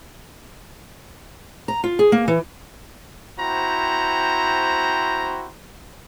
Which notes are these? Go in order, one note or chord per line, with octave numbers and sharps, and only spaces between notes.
A#5
F4
G#4
A#3
E3
C4 E4 F#4 C5 G5 A#5